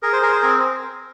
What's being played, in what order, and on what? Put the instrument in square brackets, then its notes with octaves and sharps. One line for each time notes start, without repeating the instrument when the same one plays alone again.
[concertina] G#4 A#4
C5
G#4 A#4
C5
C4 A#4